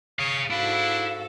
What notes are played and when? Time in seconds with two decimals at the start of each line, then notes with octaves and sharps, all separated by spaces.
0.19 G#4 C#5 F5
0.50 G#2 D4 E4 F#4 A4 F5 B5